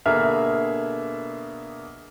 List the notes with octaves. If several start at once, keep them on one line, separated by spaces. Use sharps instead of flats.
B2 D3 A#3 G#4 E5 F6